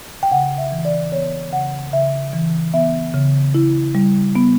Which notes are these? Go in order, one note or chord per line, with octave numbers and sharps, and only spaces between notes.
G5
C#3 F#5
E5
E3
D5
B3 C#5
C#3 F#5
C#3 E5
E3
B3 E5
C#3
E4
G3
B3